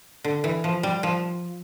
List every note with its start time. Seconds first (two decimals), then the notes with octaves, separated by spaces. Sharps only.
0.24 D3
0.44 E3
0.64 F3
0.83 G3
1.03 F3